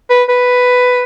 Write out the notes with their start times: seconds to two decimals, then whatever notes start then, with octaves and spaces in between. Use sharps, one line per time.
0.10 B4
0.29 B4